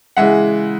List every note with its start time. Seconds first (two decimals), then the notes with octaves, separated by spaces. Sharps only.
0.17 C#3 E3 G#3 E5 F#5